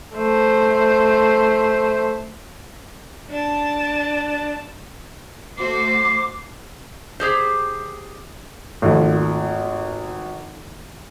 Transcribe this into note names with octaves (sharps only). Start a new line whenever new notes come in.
A3 C5
D4 A5
A3 F#4 C5 D6 C7
G4 G#4 C5
G#1 D#2 F3 A3